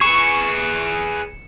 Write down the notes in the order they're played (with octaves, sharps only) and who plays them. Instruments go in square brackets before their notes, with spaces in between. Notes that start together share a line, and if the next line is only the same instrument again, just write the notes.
[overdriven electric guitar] G#4 B4 [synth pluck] C#6 [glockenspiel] C#7 E7